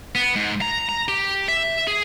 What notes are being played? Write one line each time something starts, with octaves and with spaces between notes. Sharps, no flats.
B3
G#2
A#5
A#5
G4
E5
G#4